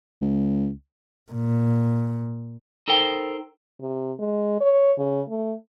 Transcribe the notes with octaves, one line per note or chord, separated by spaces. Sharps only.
C#2
A#2
D#4 A4 A#4 C5 G5
C3
G#3
C#5
C#3
A3